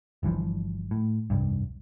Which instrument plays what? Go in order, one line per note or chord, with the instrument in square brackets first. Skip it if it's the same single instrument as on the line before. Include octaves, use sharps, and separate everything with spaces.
[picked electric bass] G1 G2 E3 F3
A2
F1 C2 G2